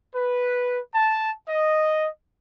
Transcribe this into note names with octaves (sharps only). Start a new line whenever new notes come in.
B4
A5
D#5